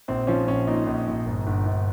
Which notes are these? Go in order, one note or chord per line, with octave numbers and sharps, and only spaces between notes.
A#1 C4
F3 C#4
A#1 C#4
A#2 D#4
A#1
A#1
G1
G1
G1